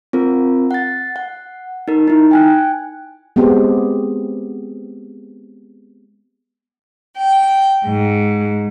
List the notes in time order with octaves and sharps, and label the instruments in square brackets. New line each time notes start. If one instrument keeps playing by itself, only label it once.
[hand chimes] C4 F4 A#4
F#5 A6
F#5
D#4 A#4
D#4 E4
G5 G#5 F#6
[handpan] G#3 B3 C4 G4 G#4
[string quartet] G5
G#2